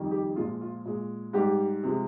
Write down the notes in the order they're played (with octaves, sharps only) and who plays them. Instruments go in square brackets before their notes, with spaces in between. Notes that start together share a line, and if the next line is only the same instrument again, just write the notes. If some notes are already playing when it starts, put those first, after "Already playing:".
Already playing: [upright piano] F2 D#3 G3
G4
A#2 F3 G#3 F4
F4
A#2 G#3
G#2 G3 G4
C3 F3 G#3